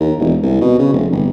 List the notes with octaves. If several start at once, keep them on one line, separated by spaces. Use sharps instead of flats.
D#2
E1
C2
B2
C#3
F1
G1